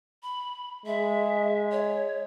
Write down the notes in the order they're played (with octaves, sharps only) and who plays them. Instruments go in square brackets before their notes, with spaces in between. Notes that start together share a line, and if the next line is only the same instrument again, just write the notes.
[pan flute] B5
[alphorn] G#3 [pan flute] E5
[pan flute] C#5